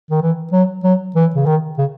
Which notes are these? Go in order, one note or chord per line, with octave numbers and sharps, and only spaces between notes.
D#3
E3
F#3
F#3
E3
C#3
D#3
C#3